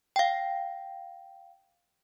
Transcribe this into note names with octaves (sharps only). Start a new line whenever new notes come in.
F5 G5